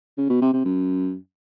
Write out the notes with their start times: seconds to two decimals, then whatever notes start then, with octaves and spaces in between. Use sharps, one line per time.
0.18 C#3
0.30 B2
0.41 C3
0.53 C3
0.65 F#2